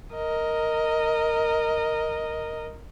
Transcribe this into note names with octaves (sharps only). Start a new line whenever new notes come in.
A#4 D#5